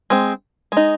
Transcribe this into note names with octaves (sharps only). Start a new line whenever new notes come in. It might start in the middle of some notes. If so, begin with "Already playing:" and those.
G#3 C4
G#3 D#4